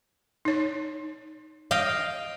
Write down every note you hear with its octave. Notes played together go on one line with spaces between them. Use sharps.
D#4 C#5
D#5 F5 G5